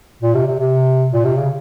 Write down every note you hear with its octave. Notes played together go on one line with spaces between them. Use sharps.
A#2
C3
C3
C3
A#2
C3
C#3